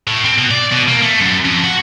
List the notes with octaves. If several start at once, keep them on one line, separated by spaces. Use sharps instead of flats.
A2
C4
B2
D5
B2
A#3
A3
F#2
F2
F#4